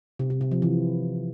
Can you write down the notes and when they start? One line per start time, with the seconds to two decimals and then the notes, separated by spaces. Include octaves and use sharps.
0.19 C3
0.30 C3
0.41 C3
0.51 F3
0.62 E3